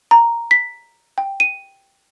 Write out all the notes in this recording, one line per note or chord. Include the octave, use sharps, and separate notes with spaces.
A#5
B6
G5
D#7